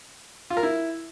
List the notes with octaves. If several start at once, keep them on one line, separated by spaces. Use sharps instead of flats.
F4
A#4
E4